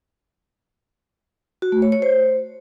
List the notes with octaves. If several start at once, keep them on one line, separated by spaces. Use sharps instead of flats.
F#4
A3
C#5
C#5
C5